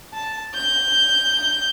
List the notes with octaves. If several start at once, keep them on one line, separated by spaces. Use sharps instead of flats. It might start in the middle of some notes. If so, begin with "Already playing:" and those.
A5
G6